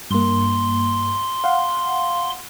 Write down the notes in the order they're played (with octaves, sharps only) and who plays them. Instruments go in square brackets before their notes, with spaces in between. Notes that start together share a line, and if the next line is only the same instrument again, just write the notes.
[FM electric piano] G2 A#3 [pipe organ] C6
[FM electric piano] F5 F#5